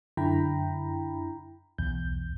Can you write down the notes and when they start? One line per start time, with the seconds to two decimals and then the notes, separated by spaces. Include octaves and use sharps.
0.17 F#2 D3 E4 G5 A#5 B5
1.78 B1 E2 G6